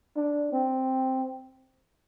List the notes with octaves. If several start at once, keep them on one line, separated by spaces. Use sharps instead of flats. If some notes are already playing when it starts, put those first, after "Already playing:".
D4
C4